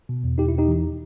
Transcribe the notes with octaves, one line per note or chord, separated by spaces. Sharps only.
B2
E2
B2 D#4 G4
E4
E2
D#4 G4
E3